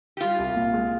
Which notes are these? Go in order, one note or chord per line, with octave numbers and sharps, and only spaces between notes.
G4
G3 F4
C2
A#2
G#3